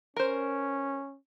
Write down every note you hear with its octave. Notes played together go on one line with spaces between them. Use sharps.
C#4 A#4 C5